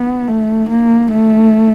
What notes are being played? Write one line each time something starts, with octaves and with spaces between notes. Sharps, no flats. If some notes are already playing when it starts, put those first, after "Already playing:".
Already playing: B3
A3
A#3
A3